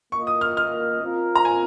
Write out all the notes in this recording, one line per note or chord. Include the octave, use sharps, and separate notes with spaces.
A#3 F4 A#4 D#5 C#6
D#6
F6
F6
C4 F4 A#4
A#5
G#5